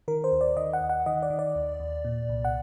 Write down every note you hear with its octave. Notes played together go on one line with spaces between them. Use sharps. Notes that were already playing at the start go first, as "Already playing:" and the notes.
D#3 A#4
C5
D#2
D5
D#3 D#5
F#5
D#2
F#5
D#3 D#5
D5
D#3
D5
D#2
D#2
A#2
C2
F#5